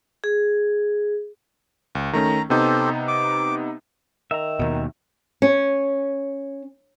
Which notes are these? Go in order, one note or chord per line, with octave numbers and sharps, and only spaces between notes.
G#4
C#2
D#3 A3 C#4 A#5
C3 B3 D#4 G4 A4 C5
D6
D#3 E5 A#5
D#2 B2
C#4